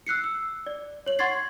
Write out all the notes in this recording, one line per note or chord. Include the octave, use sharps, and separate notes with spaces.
E6 F#6 C7 C#7
E6
D5
C#5 F#7
F#5 C6 C#6 G#6 A6 C7